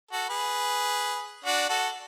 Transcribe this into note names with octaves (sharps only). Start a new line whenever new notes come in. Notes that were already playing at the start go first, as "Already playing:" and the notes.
F#4 A4
G#4 B4
D4 F#4
F#4 A4